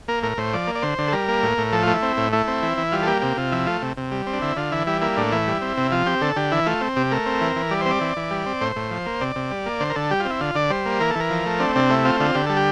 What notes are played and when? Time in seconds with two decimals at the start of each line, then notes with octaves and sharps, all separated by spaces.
0.08 A#3 A#4
0.23 A2 A#4
0.37 A2 C5
0.53 F3 D5
0.67 A#3
0.75 D5
0.82 D3 C5
0.98 D3
1.08 A4
1.13 G3 A#4
1.28 A#3
1.43 A2
1.58 A2
1.72 F3 A4
1.83 A3 F4
1.93 E4
2.02 C4
2.17 A2
2.33 A3 E4
2.48 C4
2.63 E3
2.78 E3
2.92 G3 F4
3.03 A4
3.07 A#3 G4
3.22 C3 G4
3.37 C3 F4
3.52 F3 E4
3.67 A3 F4
3.82 C3
3.97 C3
4.11 G3
4.27 C4
4.33 D4
4.42 D3 E4
4.56 D3 F4
4.72 E3 E4
4.87 G3 E4
5.01 A#3 E4
5.17 A2 D4
5.32 E3 E4
5.47 G3
5.62 C4
5.77 C3
5.91 F3 F4
6.06 C4 G4
6.21 D3 A4
6.36 D3 G4
6.52 E3 E4
6.66 A3 F4
6.81 C4
6.96 C3 G4
7.11 A3 A#4
7.26 C4
7.41 E3
7.56 E3
7.71 G3 D5
7.81 C4 C5
7.91 D5
8.01 E3
8.17 E3
8.31 G3
8.46 C4
8.61 A2 C5
8.76 A2
8.91 F3
9.06 A#3
9.21 C3 D5
9.36 C3
9.51 G3
9.66 A#3
9.80 D3 C5
9.90 A#4
9.95 D3 A4
10.11 G3 G4
10.20 C4 F4
10.30 E4
10.40 D3 F4
10.55 D3 D5
10.70 G3 C5
10.86 A#3
11.00 E3 A#4
11.10 A4
11.15 E3 A#4
11.30 F3
11.46 A3
11.60 C4 D4
11.76 C3 D4
11.90 A3 E4
12.05 C4 F4
12.20 D3 F4
12.34 D3 G4
12.47 G3 A4
12.57 G4